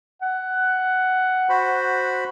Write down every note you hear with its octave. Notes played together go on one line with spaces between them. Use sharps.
F#5
F#4 C5 B5